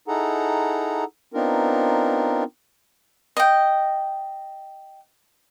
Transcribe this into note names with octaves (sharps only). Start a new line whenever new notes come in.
D#4 E4 G#4 A4 F#5 A#5
B3 C4 D4 D#4 F4 A#4
D#5 G5